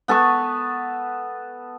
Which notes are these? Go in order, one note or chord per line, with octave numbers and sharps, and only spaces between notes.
B3 A4 B4 C#6